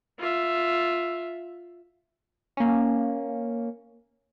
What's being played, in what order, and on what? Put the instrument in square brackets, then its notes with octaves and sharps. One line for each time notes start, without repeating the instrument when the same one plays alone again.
[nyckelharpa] F4 E5
[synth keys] A#3 C#4